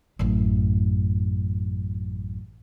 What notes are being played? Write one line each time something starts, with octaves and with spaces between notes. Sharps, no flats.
A1 F#2